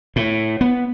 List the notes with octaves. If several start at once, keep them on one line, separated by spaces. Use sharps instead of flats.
A2
B3